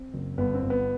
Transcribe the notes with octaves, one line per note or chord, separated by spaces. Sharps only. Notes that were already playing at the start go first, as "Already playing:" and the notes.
Already playing: C4
F#1
G1 B3
C4
G1
B3